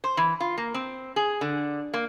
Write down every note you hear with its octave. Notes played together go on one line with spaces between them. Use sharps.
C5
E3
F4
A#3
C4
G#4
D3
A#3